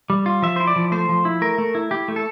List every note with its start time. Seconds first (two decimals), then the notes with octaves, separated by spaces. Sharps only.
0.10 G3
0.26 F4
0.42 F3 E5
0.56 E4 C5
0.67 D5
0.76 F3
0.92 A3 C5
1.09 F3
1.25 E4
1.41 A3 A#4
1.58 A3
1.75 E4
1.91 E4 G4
2.08 A3
2.16 A4